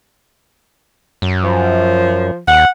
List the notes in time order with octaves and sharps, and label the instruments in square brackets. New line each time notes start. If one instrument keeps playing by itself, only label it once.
[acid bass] F#2
[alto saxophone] F3
[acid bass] D#2 [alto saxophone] F#5